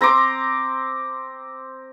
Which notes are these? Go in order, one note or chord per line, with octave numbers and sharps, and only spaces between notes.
C4 A#5 C6 D6